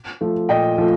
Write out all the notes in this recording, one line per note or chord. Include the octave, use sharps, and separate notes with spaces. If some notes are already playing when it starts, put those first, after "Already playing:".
F3 A3
A#2 D#5 G5
F3 A3